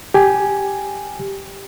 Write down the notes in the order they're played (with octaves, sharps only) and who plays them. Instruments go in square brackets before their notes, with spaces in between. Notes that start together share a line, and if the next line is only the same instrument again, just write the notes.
[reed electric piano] G4 G#5